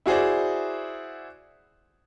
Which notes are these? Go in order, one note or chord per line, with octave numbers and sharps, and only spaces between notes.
E4 F#4 G#4 C5 D5